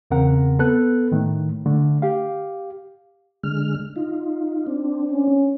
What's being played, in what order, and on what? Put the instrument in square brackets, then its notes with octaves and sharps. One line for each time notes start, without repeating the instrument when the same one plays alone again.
[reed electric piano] E2 C#3 C4 A#4 F#5
B3 A4 B4 F#6
A2 D#3 A3
D3 A3
G4 F5
[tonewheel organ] D3 G#3 F6
D#4 F4
C4 D4
[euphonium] C#4